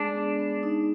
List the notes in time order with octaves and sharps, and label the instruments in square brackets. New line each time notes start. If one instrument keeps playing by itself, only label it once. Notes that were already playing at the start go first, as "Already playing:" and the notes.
Already playing: [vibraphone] G#3 G#4 [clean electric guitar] D4
[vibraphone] B3
B3
D#4